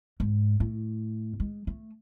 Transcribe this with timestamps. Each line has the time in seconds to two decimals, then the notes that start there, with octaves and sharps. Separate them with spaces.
0.20 G#2
0.60 A2
1.40 G#3
1.67 A3